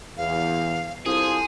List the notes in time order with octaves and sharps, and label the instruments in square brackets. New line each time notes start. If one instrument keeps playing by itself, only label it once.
[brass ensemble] E2 [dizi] F5
[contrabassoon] C2 [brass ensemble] F4 A4 C5 [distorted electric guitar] G#4 [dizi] D#6